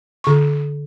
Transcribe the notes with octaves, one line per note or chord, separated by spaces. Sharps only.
D3 C#6